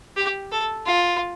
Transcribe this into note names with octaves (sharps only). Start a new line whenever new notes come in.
G4
A4
F4